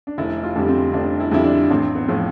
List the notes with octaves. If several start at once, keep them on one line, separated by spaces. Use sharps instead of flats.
D4
F1 E4
F4
F2 D3 G3
C4
F1 D4
E4
F2 D3 G3 E4
D4
A1 C4
B3
A2 F3